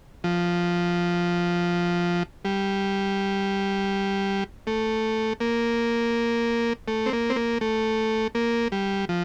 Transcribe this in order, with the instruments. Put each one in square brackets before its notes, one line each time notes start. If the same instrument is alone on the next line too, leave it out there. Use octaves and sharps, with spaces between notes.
[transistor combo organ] F3
G3
A3
A#3
A3
C4
A#3
C4
A#3
A3
A#3
G3
F3